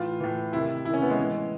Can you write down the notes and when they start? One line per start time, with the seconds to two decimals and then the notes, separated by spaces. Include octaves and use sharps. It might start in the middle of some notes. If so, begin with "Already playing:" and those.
Already playing: A2 E3 F4
0.20 A2 E3
0.53 C3 D#3 E4
0.85 C3 E4
0.89 D#3 C#4
1.02 B3
1.10 G#3
1.17 E3
1.22 A2